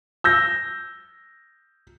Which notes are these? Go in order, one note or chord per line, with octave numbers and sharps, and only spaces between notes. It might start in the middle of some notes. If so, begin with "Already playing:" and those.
E6 G6 A#6